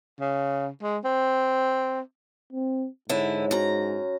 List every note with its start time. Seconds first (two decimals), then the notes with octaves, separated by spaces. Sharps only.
0.20 C#3
0.82 G#3
1.05 C4
2.53 C4
3.09 G#2 D3 E4 C#5
3.51 F#2 A#5